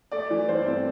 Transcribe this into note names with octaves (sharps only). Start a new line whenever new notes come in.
A3 D5
E3
G2 C5
C4